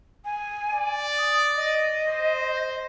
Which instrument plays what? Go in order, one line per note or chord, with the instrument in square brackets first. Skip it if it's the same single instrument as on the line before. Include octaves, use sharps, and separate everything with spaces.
[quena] G#5
[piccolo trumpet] D5
[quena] D#6
D#5
[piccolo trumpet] C5